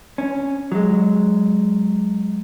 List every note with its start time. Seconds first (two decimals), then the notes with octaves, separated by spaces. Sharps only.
0.18 C#4
0.72 F#3 G#3